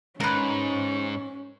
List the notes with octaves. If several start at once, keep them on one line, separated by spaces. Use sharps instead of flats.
G#2 C#4 A#4 B4